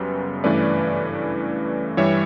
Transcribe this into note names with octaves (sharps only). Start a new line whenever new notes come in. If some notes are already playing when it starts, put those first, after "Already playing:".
Already playing: F#2 C#3 G3 B3 B4
G2 E3 A3 C#4 B4 D5
G2 E3 G3 C#5 E5